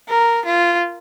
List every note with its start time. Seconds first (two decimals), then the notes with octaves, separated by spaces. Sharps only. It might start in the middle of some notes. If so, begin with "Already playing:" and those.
0.09 A#4
0.45 F4